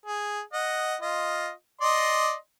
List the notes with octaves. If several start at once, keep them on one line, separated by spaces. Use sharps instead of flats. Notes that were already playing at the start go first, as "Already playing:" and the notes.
G#4
D#5 F#5
F4 D#5
D5 D#5 C6